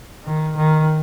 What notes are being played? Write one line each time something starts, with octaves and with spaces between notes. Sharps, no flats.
D#3
D#3